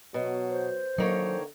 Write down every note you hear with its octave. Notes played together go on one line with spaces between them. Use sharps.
B2 F#3
C5
D3 D#3 F#3 A#3 C#5